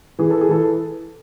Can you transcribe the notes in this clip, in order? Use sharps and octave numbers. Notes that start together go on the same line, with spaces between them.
E3 G#4
A4
G#4
E3 A4